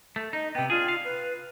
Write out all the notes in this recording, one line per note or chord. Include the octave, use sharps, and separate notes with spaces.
A3
D#4 D#5
C3 B3 G5
D4 F4 G#4
F5
B4